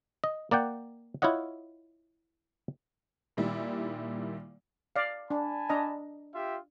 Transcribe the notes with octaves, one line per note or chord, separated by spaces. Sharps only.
D#5
A#3 D5 F#5 G5
E4 F4 C#5 D#5 F#5
A#2 D#3 G3 E4
D5 F5
D4 G#5 A5 B5
D4 D#5 A#5
F4 G4 E5